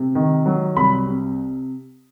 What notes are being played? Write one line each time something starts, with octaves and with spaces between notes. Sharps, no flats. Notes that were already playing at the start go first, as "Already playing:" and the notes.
Already playing: C3
D#3
F#3
C2 B5
C3